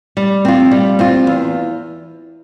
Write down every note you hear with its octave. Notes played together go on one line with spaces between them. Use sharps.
G3
C4 F4
G3
C4 F4
E2